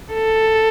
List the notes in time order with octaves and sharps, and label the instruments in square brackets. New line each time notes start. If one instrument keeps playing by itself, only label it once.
[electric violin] A4